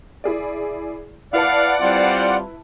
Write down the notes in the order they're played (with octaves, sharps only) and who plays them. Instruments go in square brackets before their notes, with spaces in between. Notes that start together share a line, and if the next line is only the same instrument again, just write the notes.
[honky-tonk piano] E4 G#4 D5
[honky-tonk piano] E4 B4 A5 [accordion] D5 F#5 [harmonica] F5
[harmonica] G3 C4 F4